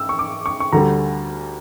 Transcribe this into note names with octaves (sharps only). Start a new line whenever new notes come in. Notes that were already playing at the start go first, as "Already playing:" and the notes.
Already playing: E6
C#6
D6
C#6
C#6
D2 D3 G3 A#5